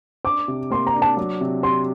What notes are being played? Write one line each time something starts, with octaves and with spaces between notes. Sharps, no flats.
D4 D6
C3
A#3 C6
A#5
D4
A5
F#3
C3
C3 C6